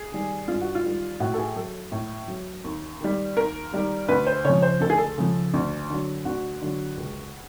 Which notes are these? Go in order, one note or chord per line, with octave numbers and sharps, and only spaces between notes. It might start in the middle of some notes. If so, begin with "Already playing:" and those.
Already playing: G#4
D#3 G3
G2 F4
F#4
F4
D#3 G3
A2 F#4
A4
G#4
F#3 A4
A2
F#3
D#2
D#3 G3
D#2 A#4
D#3 G3
D2 B4
C5
C#3 F3 C#5
C5
D2 A4
G#4
A4
C#3 F3
D2
D3 F#3
D2 F#4
D3 F#3
C#2